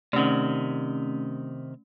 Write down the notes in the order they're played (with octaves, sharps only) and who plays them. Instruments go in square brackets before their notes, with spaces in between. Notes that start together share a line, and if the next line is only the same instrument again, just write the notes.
[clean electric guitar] C3 D#3 [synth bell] A3 C#4